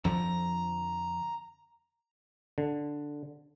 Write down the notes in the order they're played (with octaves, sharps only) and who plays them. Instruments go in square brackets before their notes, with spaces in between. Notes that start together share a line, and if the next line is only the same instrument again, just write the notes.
[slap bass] F2 D3 F3 [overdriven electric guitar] A#5
[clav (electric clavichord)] D3